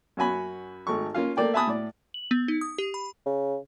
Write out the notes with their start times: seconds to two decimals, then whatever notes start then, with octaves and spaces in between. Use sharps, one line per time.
0.17 F#2 C#4 F#4 G#5 B5
0.87 G#1 A3 C#6
1.15 A#3 C#4 F4 F5
1.37 A3 A#3 D5 G5
1.54 E5 G#5 A5 B5 D#6
1.67 A2 D5
2.14 F#7
2.31 B3
2.48 D#4
2.61 D#6
2.78 G4
2.94 B5
3.26 C#3